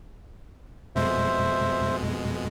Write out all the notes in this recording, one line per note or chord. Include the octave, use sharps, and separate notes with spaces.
F2 B2 G#3 C5 E5